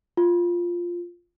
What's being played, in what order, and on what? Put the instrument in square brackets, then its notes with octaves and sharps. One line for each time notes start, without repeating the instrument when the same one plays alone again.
[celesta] F4